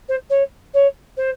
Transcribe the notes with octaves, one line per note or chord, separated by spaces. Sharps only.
C5
C#5
C#5
C5